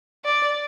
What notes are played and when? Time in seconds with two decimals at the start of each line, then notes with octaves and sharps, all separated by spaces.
0.25 D5